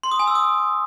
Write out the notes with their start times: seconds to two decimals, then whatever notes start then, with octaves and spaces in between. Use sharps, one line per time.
0.03 C6
0.11 D#6
0.19 G#5
0.27 E6
0.35 D#6